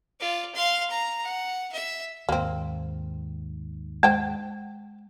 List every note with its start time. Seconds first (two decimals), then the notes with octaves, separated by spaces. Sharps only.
0.20 F4 D5
0.55 F5 C6
0.90 A#5
1.24 F#5
1.73 E5
2.29 D#2 G#2 A#3 C4
4.03 G#3 C5 G5 A5